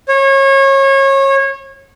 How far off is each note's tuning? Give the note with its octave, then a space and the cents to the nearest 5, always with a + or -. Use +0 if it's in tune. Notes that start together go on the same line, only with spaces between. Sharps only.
C#5 -30